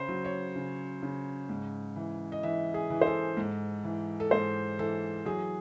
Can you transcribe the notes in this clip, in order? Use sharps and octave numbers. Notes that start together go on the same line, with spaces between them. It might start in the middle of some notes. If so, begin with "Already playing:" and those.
Already playing: C#3 C5
F#3
C#5
C#3
C#3
G#2
E3
D#5
E3 E5
G#4
E3
C5
A4
G#2
E3
A4
G#2 C5
E3 A4
F#3 G#4